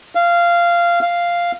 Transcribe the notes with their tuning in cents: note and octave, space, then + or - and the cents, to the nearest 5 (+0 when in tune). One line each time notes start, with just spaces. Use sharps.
F5 -15
F5 -5